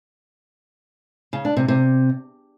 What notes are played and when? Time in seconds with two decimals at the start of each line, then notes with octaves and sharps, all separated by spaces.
1.33 C#3
1.45 D4
1.57 C3
1.68 C3